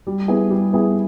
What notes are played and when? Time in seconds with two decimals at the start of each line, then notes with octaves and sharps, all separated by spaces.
0.07 G3
0.28 B3 E4 G#4
0.50 G3
0.73 B3 E4 G#4